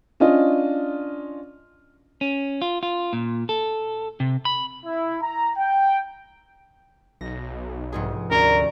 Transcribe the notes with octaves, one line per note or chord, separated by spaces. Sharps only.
C#4 D4 F4 D#5
C#4
F4
F4
A#2
A4
C3
B5
E4
A#5
G5
B1 A#6
F1 G#2 G#4
D2 C#4 A#4 D5